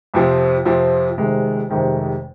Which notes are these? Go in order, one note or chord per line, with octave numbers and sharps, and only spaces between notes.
F2 C3 F3 C4
F2 C3 F3 C4
F1 F2 C3 D#3 G#3
F1 F2 C3 D#3 G#3